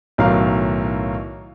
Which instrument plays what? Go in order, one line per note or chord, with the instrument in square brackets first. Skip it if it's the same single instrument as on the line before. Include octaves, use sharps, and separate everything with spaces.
[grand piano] B1 A2 D#3 F#3 A#4 F5